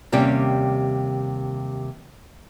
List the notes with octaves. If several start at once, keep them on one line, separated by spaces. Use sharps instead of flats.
D#2 C3 G3 C#4 G4